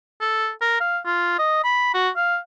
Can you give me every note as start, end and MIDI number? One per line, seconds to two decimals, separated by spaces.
0.20 0.50 69
0.61 0.77 70
0.80 0.98 77
1.05 1.35 65
1.39 1.62 75
1.64 1.93 83
1.94 2.09 66
2.16 2.38 77